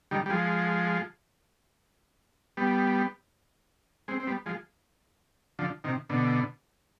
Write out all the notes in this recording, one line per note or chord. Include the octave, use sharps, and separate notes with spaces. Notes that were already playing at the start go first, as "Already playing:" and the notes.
D#3 G3
G3
F3 G#3
G3 B3
G#3 C4
C4
G3 B3
F3 G#3
D3 F3
C3 D#3
B2 D3